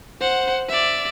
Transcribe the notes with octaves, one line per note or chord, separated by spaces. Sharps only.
C5 F#5
D5 E5